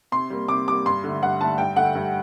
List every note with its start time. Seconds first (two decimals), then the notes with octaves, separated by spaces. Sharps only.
0.12 C3 C6
0.30 G3 A#3
0.49 C3 D6
0.68 G3 A#3 D6
0.86 G2 C6
1.04 D3 A3
1.22 G2 F#5
1.41 D3 A3 A5
1.58 G2 G5
1.76 D3 A3 F#5
1.95 G2